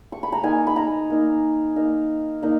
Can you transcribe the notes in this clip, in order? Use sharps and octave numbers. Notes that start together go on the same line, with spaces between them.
C#6
B5
A#5
A#3 D#4 G#5
B5
A#5
A#3 D#4
A#3 D#4
A#3 D#4